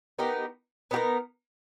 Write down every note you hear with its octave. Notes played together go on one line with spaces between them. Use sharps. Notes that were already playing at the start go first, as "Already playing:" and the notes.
B3 D#4 G4 A#4
B3 D#4 G4 A#4